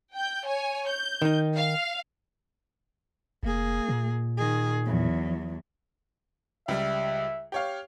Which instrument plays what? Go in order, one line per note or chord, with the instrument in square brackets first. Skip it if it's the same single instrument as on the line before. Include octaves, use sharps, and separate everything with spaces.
[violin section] G5 G6
C#5 G#5
G6
[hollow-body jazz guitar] D#3 D#4
[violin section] F5
[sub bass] F1 [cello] A#3 G#4
[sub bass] A#2
[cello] D#3 G#4
E2 F#3
[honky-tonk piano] C#2 G3 [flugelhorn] E5
[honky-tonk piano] G4 C#5 F5